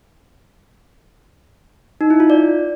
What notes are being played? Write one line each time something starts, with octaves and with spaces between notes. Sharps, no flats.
D#4
E4
F4
D5